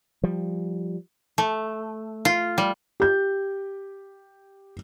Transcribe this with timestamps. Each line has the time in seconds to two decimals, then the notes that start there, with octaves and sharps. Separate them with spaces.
0.24 F3 G3
1.38 A3
2.25 F4
2.58 G3
3.00 G4 G6